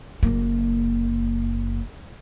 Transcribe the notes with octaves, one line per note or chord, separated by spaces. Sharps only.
F#1 A#3